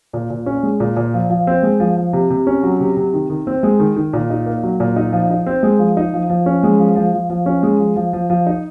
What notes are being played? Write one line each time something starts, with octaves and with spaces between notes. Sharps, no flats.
A#2
A#2
C#4
G#3
A#2
A#2
F3
F3
C4
G#3
F3
F3
C3
C3
C#4
F#3
C3
C3
D#3
D#3
C4
G#3
D#3
D#3
A#2
D#4
A#3
F#3
A#2
D#4
F3
D#4
C4
G#3
F3
D#4
F3
F3
C#4
G#3
F3
F3
F3
F3
C#4
G#3
F3
F3
F3
F3
D#4